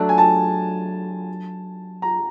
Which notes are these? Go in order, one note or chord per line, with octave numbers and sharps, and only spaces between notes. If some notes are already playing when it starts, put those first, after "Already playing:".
Already playing: F#3 A3 D4 A5
G#5
A5
A#5